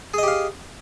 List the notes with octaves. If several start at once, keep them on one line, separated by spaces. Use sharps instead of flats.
G4 G#4 D#5 F5